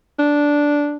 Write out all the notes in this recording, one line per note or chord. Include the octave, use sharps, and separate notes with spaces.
D4